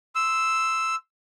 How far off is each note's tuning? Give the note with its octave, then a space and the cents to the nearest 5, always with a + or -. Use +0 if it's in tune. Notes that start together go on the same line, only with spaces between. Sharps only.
C6 -10 E6 +0